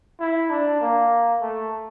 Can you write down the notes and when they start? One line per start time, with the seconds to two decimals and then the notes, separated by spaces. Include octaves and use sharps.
0.20 E4
0.50 D4
0.81 A#3
1.42 A3